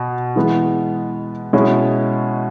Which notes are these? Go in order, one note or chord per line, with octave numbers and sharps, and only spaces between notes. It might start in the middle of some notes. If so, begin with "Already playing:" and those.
Already playing: B2
E3 G#3 B3
B2 G#3 C#4 E4